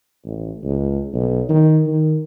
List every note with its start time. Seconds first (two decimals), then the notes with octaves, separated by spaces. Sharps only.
0.25 A1
0.64 C#2
1.13 B1
1.49 D#3
1.87 D#3